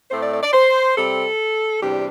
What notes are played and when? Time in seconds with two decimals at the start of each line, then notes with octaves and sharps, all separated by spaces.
0.10 A2 A3 C4 C5
0.21 D5
0.32 D5
0.42 D5
0.53 C5
0.95 C3 G3 C4 A4
1.81 E2 C3 G3 D4 G4